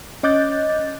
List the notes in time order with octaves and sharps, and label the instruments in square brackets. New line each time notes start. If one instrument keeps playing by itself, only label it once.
[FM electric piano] C#4 D#5 D6 F#6 G6 A6